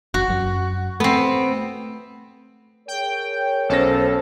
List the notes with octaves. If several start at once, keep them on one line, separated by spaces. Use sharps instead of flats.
F#1 F#4
F#2
A3 B3 C4
G#4 A#4 C#5 G5
B1 C#4 A4 C5 A#6